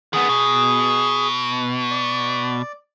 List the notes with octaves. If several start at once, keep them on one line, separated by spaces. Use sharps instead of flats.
D#3 B3 G#4
B2
D5